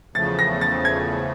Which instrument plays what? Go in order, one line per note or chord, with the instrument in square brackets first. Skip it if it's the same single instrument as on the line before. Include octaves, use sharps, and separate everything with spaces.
[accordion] E2 C#3 F3 A3 [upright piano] A6
[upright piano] A#6
A6
G#6